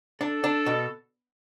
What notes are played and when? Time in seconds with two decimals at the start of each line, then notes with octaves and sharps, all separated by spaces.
0.21 D4 A4
0.44 D4
0.66 B2